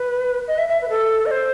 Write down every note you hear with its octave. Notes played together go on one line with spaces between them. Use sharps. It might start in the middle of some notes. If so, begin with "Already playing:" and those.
Already playing: B4
D#5
E5
E5
B4
A4
D#5
C5